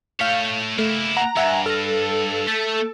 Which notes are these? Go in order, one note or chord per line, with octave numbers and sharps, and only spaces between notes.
A3 C#5 F5 G6 B6
A3 A#3 E4
F#5 A#5
G2 E5 F#5 G#5
A4 F6 A#6
A3 A6 B6